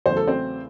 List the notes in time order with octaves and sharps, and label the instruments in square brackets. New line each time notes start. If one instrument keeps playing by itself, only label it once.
[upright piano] E2 C#3 F#3 A3 C5
A4
C4 C5